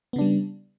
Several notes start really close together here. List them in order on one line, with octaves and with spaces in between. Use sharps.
B3 C#3 D4 G3